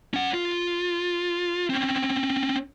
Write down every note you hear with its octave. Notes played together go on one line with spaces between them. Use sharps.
C#4 F#5
F4
C4 C#4